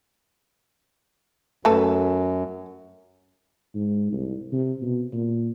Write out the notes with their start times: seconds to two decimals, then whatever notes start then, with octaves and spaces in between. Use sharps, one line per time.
1.65 F#2 A3 A4 B4
3.75 G#2
4.12 C2
4.52 C3
4.82 B2
5.13 A#2